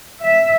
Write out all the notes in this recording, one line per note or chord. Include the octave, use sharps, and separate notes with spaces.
E5